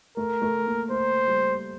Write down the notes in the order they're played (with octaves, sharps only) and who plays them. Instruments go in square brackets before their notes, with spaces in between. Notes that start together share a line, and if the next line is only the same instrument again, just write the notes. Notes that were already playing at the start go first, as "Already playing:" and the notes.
[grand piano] A3 [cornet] A#4
[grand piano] A3
A#3
[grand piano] A3 [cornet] C5
[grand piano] G3